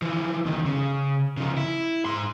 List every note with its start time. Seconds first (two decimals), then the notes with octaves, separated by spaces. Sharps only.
0.02 E3 F3
0.46 C#2 D#3
0.66 C#3
1.37 C#3 F3
1.57 E4
2.05 G#2 C6